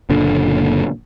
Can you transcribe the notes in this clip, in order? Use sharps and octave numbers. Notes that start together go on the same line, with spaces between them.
F#1 A#2 D3 D4